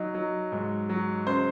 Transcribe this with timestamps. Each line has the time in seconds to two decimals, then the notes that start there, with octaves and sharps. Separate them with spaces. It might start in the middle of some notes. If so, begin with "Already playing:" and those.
Already playing: F#3 D#4
0.15 F#3
0.52 G#2
0.89 F#3
1.27 C#3 C5